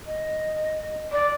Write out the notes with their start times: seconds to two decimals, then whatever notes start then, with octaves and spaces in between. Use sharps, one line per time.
0.07 D#5
1.12 D5